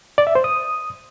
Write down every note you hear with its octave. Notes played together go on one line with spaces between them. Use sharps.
D5
E5
C5
D#6